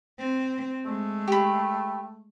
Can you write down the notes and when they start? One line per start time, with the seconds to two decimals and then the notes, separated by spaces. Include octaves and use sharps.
0.19 C4
0.86 G#3 A3
1.27 G4 B5